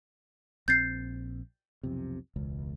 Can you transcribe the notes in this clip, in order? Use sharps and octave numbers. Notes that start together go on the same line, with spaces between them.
A#1 C4 G6 A6 C7
B1 F2 C3
E1 C#2